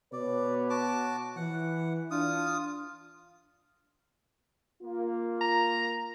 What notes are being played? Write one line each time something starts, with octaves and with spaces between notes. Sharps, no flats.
B2 B4 C#5 D5
F#4 A5 D6
E3 F#5
D4 F4 D#6
A#3 F4
A#5